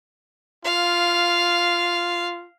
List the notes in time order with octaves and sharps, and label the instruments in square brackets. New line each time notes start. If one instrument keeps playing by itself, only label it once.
[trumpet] F4 [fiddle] F5